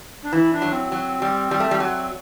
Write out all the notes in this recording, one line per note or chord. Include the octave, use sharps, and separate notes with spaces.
D4
E3 E4
D4
F#3
C4
F#3
G3
G3
A3
G3
F#3